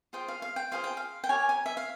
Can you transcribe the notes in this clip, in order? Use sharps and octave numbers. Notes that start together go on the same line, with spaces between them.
F4 G#4 C5 G5
F5
F5
G5
F4 G#4 C5 F5
G5
F5
G5
G4 A#4 C#5 G#5
G#5
E5
F5